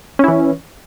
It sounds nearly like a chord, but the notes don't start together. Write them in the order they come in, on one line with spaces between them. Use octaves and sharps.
C#4 E4 E3